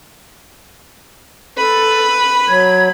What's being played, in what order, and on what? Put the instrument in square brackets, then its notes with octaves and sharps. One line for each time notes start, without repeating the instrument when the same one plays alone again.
[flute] A4 [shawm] B4 [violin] B5
[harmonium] F#3 [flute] G#6